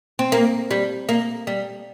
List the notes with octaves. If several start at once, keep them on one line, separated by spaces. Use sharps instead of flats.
C4
A#3
G3
A#3
G3